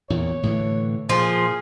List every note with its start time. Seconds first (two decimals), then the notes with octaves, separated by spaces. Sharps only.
0.10 E2 A#2 C#5
0.43 A2 D3 E3
1.09 A#2 F3 G#4